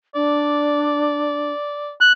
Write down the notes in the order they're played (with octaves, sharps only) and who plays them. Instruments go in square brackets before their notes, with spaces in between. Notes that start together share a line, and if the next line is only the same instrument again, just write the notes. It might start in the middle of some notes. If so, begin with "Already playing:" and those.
[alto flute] D4 [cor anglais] D5
[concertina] F#6